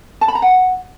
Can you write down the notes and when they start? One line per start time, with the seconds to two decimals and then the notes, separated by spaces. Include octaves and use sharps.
0.21 A5
0.28 B5
0.35 A#5
0.42 F#5